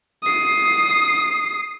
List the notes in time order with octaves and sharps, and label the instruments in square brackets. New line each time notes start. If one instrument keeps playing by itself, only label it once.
[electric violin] D#6 C7